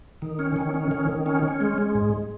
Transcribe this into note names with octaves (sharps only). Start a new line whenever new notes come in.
D#3
C#4
D#3
C#4
D#3
D#3
C#4
C#4
G#3
G#3
G#2